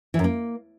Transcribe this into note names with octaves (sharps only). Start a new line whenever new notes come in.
E3
F#2
A#3